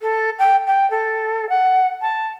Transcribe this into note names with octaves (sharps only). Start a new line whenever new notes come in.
A4
G5
G5
A4
F#5
A5